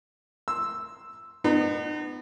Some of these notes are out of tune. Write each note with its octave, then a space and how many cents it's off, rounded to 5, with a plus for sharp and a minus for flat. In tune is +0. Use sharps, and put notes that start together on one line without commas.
C6 +0 E6 +0
B3 +20 D#4 -40